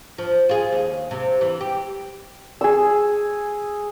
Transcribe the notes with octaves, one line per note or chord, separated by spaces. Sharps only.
F3
F4 G#4
D#2
C3
E3
G4
G#4 C#6 E6